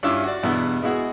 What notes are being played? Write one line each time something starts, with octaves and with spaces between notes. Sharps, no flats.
G2 C#4 E4 F4 E5 D6
F#4 D5
E2 G2 B2 B3 E4
G#3 B3 E4 F#4 G#4